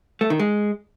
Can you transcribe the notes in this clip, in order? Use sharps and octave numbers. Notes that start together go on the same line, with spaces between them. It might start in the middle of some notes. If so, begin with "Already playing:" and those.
A3
D#3
G#3